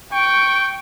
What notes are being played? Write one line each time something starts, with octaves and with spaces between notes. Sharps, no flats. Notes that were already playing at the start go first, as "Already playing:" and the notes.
G5 C#6 D7